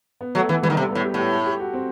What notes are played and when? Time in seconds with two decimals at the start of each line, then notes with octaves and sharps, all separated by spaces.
0.21 B3
0.35 F#3 A3
0.49 E3 A3
0.63 E3 G3
0.70 D#3
0.77 C3 A3
0.91 A2 B3
1.04 G4
1.14 A2 G4
1.32 A4
1.46 G4
1.60 F#4
1.73 C4